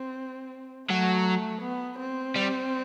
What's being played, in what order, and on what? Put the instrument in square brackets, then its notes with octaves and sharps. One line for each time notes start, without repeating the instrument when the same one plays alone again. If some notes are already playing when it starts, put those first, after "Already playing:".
Already playing: [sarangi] C4
[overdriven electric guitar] F#3 [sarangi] A3
[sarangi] B3
C4
[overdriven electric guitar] G3